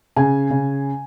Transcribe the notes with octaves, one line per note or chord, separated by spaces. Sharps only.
C#3 G#5
C#3